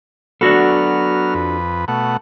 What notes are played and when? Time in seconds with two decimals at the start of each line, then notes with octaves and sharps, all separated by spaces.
0.41 F#3 B3 D4 F#4 A4 F6
1.35 F2 B4
1.88 B2 A3 F#5